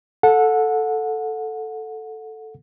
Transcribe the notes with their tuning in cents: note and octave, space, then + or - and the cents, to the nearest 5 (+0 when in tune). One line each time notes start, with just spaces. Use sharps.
A4 +0 F#5 -25